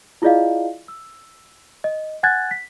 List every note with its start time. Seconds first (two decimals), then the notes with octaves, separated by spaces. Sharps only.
0.22 E4 F4 G#4 D5 D#5 F5
0.88 E6
1.84 D#5
2.23 F#5 G#5 F#6 G#6 A6
2.51 B6